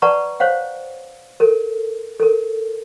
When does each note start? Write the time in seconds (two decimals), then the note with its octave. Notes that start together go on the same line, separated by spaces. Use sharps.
0.02 B4 D5 F#5 A5 A#5 C#6
0.40 C5 C#5 F5 F#5
1.40 A4 A#4
2.20 A4 A#4